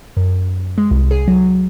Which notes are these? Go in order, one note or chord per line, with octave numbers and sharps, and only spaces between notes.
F#2
G#3
C2
G#4
F#3